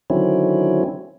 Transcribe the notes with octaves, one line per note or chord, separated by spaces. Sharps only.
D3 D#3 F#3 C4 C#4 E4